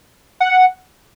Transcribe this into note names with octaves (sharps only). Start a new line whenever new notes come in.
F#5